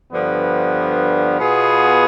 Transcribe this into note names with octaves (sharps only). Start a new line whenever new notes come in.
G2 D3 F3 B3
B2 B3 F4 G#4